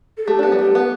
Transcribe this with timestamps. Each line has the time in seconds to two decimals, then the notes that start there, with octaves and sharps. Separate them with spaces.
0.18 A4
0.27 A3 G4
0.39 D4
0.43 B3 G4
0.52 G3
0.59 A3 G4
0.75 B3